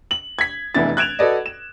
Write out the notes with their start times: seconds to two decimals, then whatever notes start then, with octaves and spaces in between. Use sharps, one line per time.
0.11 F#7
0.39 G#6 B6
0.75 F1 E2 E3 D4 E4 A6
0.97 F#6 G#6 D7 E7 F7
1.19 F#4 A4 B4 D5 D#5
1.46 E7